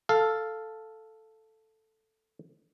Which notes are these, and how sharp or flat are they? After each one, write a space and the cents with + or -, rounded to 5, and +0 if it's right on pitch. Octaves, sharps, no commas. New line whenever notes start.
A4 +0 F5 +0